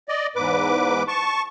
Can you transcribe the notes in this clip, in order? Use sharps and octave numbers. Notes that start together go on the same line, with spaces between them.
D5 D#5
E2 G#2 B4 D6
A5 C#6